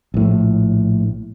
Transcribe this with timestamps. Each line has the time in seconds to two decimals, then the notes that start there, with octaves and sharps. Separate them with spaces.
0.14 A#1 A2